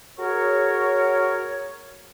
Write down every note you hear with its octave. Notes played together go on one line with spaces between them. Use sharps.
F#4 G#4 A#4 C#5